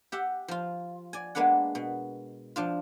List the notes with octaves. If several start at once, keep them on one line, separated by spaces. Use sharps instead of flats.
G4 E5 F#5
F3 F4
D5 G#5
G#3 A#3 B3 D4 F#5
B2
F3 D4 F4